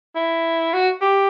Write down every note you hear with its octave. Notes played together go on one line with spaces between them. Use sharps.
E4
F#4
G4